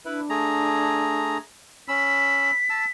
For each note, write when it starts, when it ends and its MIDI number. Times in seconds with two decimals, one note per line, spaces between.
0.05 1.37 62
0.05 0.21 64
0.05 0.21 71
0.30 1.38 57
0.30 1.38 68
0.30 1.38 82
1.88 2.51 61
1.88 2.51 83
1.88 2.51 88
1.88 2.91 95
2.70 2.85 81
2.70 2.85 88